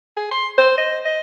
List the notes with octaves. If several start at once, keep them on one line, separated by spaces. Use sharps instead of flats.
G#4
C6
C5
D#5
D#5